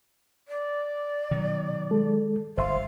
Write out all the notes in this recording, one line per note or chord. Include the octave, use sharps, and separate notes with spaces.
D5
B2 D#3 F#3
G#3 A4
G1 C5 E5 F5 C6